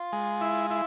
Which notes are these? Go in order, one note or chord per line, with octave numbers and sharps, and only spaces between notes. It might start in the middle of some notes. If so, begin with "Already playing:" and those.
Already playing: F4
G#3
E4
E4